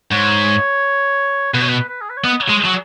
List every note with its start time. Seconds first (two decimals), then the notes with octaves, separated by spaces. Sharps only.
0.12 G#2 C#5
1.54 B2 B4
1.61 C#5
1.68 B4
1.89 B4
2.01 G#4
2.10 B4
2.17 C#5
2.24 B3 D#5
2.42 C#5
2.49 G#3
2.60 F#3 G#4